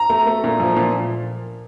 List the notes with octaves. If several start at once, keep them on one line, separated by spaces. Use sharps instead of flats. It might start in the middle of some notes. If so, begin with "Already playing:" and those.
Already playing: A#5
A3
A3
A#2
F3
A#2